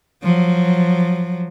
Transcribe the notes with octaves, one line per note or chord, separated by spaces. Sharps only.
F3 F#3